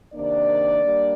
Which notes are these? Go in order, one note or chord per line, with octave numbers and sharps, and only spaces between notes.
C3 D#3 A#3 D4 D5
G3 A#3 D4